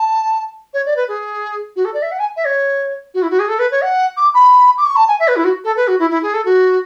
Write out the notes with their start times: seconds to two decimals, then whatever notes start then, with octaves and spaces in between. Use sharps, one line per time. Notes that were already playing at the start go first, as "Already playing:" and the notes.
Already playing: A5
0.74 C#5
0.86 D5
0.96 B4
1.08 G#4
1.76 F#4
1.85 A4
1.94 D5
2.02 E5
2.11 F#5
2.19 G#5
2.36 E5
2.46 C#5
3.14 F#4
3.22 E4
3.30 F#4
3.39 G#4
3.48 A4
3.59 B4
3.71 C#5
3.82 F#5
4.17 D6
4.34 B5
4.78 D6
4.85 C#6
4.96 A5
5.08 G#5
5.20 E5
5.28 B4
5.36 E4
5.44 F#4
5.64 A4
5.76 B4
5.87 F#4
5.99 E4
6.10 E4
6.22 G#4
6.34 A4
6.45 F#4